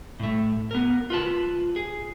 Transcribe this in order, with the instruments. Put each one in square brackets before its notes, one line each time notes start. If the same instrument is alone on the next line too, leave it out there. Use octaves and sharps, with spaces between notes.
[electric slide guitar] A2 A3
B3 A#4
F4 B4 A5
G#4